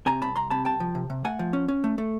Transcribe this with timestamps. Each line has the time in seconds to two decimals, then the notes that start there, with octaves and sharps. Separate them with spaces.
0.06 C3 G#5 A#5
0.22 C2 A5 B5
0.36 C2 A#5 C6
0.50 C3 A5 B5
0.65 C2 G5 A5
0.80 F3
0.95 C3
1.10 C3
1.25 A3 F#5 G#5
1.39 F3
1.53 C#4
1.68 C#4
1.84 A3
1.98 A3